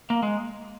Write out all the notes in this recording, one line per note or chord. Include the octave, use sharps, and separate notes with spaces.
A#3
G#3